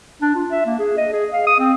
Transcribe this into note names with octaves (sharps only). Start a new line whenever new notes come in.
D4
F4
E5
A#3
G#4
D#5
G#4
F5
D#6
C4